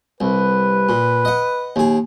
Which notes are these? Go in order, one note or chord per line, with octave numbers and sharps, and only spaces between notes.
C2 B4
A#2
D#5 F#5
D#2 G#4